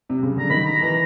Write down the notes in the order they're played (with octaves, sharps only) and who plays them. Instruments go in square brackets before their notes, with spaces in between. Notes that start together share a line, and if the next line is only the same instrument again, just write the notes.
[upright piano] C3
C#3
[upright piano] D3 [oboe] A#5
[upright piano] D#3 [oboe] B5
[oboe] A#5
[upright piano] E3 [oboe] A#5